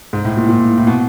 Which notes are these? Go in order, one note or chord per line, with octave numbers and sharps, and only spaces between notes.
G#2
A2
A#2
A#2
A2
A2
B2